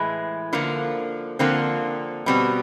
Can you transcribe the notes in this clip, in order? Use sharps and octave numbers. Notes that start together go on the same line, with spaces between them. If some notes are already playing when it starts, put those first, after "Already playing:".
Already playing: A2 E3 G#3 E4
D3 F3 A#3
D3 F3 A#3 C4
B2 G3 B3 C4